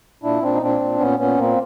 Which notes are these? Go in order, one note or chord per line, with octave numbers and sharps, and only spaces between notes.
A#2 D4 E4
A#2 C4 D4
D#4
A#2 C4 D4
A#2
A#2 B3 C#4
A#2 B3 C#4
A#2 A#3 C4